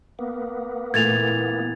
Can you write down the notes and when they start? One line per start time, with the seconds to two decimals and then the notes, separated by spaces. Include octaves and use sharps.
0.19 A#3 B3
0.94 A#2 E3 A3 G#6 A6 F7